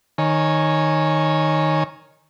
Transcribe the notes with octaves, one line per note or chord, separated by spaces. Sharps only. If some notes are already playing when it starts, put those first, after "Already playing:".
D#3 C#5 G#5